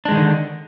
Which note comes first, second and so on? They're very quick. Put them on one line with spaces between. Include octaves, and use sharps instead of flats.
D4 G#3 D#3 D#4 D3